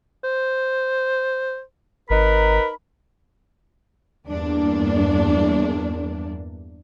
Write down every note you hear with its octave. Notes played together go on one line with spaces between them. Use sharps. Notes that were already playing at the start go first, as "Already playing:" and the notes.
C5
G#1 D#4 A#4 B4 B5
E2 G2 A#3 D4